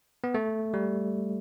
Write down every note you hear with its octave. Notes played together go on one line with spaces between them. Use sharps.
B3
A3
G3